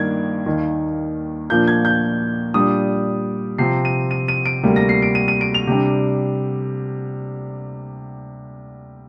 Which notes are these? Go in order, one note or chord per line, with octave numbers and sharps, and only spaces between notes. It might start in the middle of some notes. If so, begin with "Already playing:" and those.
Already playing: G2 D#3 A#3 D4 G#6
D#2 D#3 A#3
A#2 F3 A#3 D4 G6
G#6
G6
A#2 G3 D4 D#6
C3 F3 C4 C7
D#7
D#7
D#7
D7
D2 C3 G3 A#3
A#6
C7
D7
D#7
D#7
D7
F7
C3 G3 D4